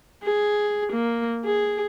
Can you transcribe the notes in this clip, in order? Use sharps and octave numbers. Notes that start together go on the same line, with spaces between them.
G#4
A#3
G#4